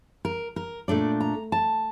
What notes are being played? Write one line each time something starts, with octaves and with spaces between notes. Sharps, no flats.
A#4
A#4
A#2 A3 D4 D5
A#5
A5